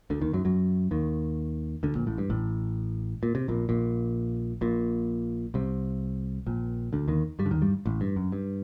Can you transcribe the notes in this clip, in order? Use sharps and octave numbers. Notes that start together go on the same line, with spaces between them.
D2 D3
D#2 D#3
F#2 F#3
F#2 F#3
D#2 D#3
D2 D3
A#1 A#2
A1 A2
G2
A1 A2
A#2
C3
A#1 A#2
A#1 A#2
A#1 A#2
C2 C3
A#1 A#2
D2 D3
D#2 D#3
G2 G3
D3
D#2 D#3
G2 G3
A1 A2
G2
F#2
G2